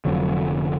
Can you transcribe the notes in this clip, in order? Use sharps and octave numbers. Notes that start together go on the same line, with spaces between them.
F1 F2 D3 F#3